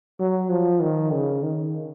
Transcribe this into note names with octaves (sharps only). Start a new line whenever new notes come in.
F#3
F3
D#3
C#3
D#3